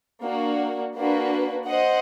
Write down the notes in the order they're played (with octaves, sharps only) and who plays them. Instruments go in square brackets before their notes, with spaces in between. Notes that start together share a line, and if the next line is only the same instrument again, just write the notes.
[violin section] A#3 D4 F#4
A#3 D4 F#4 B4
C5 D#5 F#5